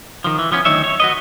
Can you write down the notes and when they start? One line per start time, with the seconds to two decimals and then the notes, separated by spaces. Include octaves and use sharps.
0.24 D#3 F3
0.39 E3
0.52 F3 B3 C#4
0.65 D2 D#3 F#3 D#4 C#5 E5
0.84 C#5
1.00 F#4 B4 D#5